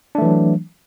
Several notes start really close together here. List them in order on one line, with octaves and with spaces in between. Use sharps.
D4 A3 E3 F#3